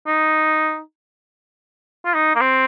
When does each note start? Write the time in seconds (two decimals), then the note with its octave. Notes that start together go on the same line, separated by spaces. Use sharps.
0.07 D#4
2.05 F4
2.14 D#4
2.35 A#3
2.41 C4